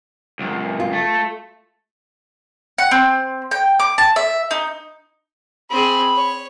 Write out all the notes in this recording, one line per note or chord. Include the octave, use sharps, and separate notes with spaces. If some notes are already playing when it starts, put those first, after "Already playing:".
C#2 F#2
F4
A3
F#5
C4
G5
D6
A5
E5
D#4
C4 G#4 B5
C#5